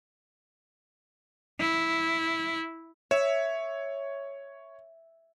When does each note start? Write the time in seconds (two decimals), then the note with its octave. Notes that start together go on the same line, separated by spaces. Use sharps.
1.60 E4
3.11 C#5 E5